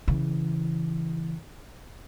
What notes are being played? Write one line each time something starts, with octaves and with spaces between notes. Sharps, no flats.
C#3 E3